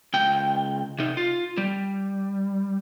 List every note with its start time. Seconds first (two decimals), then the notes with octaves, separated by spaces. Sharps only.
0.13 C#2 G5
0.99 C3 D#4
1.17 F4
1.57 G3